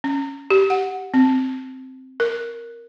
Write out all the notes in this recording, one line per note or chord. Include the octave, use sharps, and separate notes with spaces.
C#4
G4
F#5
C4
A#4